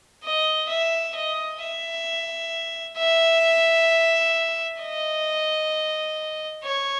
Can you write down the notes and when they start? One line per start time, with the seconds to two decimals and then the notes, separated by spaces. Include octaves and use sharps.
0.24 D#5
0.69 E5
1.15 D#5
1.62 E5
2.97 E5
4.81 D#5
6.63 C#5